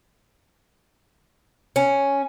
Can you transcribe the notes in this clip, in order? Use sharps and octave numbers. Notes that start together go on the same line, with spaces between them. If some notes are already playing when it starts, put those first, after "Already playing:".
C#4